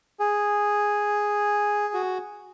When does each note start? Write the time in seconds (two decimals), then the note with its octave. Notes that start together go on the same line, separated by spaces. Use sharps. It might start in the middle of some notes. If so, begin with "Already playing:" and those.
0.20 G#4
1.94 F#4